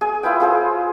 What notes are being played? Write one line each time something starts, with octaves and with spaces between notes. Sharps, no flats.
G#4 G#5
E4 F4 B4 G5
F4 G#4 C5